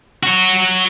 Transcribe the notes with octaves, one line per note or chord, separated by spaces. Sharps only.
F#4 C#5